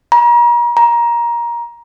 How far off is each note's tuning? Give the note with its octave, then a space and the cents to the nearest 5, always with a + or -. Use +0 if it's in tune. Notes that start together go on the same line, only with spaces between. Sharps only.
A#5 +40
A#5 +20